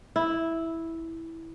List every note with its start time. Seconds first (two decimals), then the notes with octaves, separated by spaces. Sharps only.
0.16 E4